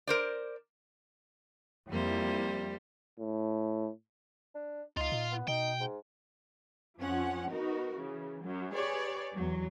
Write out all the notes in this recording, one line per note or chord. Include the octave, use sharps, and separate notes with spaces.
A#4 C5 D5
F2 G3 A#3 E4 C5
A2
D4
C#2 D#4 F4 F5
A#2
B3
B2 D#4 G5
G#2
F2 F3 C#4 F#5
B3 D#4 F#4 A#4
C#3 E3
F#2 F#3
G4 G#4 B4 C#5 D5
E2 F#3